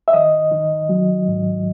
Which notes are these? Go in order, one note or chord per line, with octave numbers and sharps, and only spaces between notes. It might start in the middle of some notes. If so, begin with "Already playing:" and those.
E5
D#3 D#5
D#3
F#3
G#2